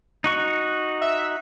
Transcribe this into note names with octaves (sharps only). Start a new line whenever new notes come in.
D#4 F#4 C#6
E5